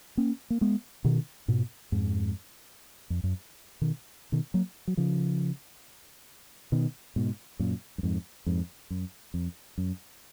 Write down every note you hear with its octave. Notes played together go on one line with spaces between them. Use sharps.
A#3 C#4
A#3
G#3 B3
B2 D#3
G#2 B2
F2 G#2
F2
F#2
B2 D#3
B2 D#3
F#3 A#3
F#3
C#3 F3
B2 D#3
G#2 B2
F#2 A#2
F#2
F2 G#2
F2 G#2
F#2
F2
F#2